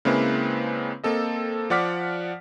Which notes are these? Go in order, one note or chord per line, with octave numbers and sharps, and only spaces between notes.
C#3 G#3 A#3 C4 E4 B4
A#3 C4 A4 D#5
F3 D5 F#5 D6 F6 B6